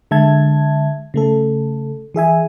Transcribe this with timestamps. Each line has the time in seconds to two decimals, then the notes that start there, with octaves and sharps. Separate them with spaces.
0.11 D3 G#3 E5 A5 G#6
1.14 C#3 A3 A4
2.14 E3 G#4 E5 G#5